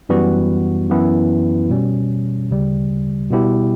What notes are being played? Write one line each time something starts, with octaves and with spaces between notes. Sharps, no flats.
F#2 E3 G3 B3 F#4
F#2 E3 B3 E4
B2 G3 C#4
D2 C#3 G3
B2 G3 B3 E4 G4